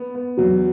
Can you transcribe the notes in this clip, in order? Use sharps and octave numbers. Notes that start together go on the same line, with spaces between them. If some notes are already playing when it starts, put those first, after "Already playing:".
Already playing: B3
B3
E2 F#3